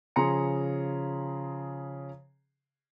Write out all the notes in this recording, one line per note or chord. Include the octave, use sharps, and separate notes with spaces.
C#3 F3 G#4 A#5 C6 C#7